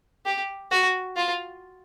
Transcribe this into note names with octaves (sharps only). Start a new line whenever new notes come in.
G4
F#4
F4